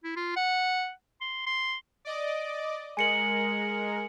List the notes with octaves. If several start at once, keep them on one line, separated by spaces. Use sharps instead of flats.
E4
F4
F#5
C6
C6
D5 D#5 D6
G#3 A#4 G#5 C#7 F#7